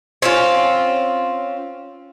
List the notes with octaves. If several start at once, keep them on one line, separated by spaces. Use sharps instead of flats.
C4 C#4 F4